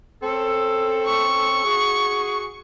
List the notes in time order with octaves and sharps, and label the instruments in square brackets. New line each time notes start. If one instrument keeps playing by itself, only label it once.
[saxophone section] C4 C#4 A4
[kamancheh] C#6
[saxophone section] F#4 G#4